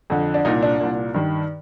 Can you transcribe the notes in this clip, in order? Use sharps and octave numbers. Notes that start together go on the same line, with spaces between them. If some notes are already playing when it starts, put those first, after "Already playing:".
F2 D3
D4
C2 A#2 D#4
D4
C2 A#2
G2 D#3